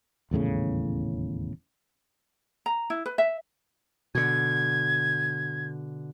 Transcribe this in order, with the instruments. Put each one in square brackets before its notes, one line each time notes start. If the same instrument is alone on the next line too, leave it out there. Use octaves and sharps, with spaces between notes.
[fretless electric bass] D#1 E2 A2 C#3
[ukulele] A#5
E4
B4
E5
[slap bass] B2 D3 [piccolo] G#6